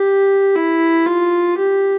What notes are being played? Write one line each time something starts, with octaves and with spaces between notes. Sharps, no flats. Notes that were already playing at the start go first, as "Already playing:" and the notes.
Already playing: G4
E4
F4
G4